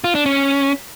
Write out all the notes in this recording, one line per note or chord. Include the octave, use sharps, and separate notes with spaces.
F4
D4
C#4